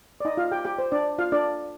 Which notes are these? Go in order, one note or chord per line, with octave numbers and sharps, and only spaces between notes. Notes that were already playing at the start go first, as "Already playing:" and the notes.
D5
D#4 D#5
F4 F5
G4 G5
G4 G5
C5
D4 D5
F4 F5
D4 D5